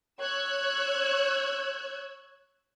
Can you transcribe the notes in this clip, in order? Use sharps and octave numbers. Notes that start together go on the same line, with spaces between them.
C#5 E6 F#6 G#6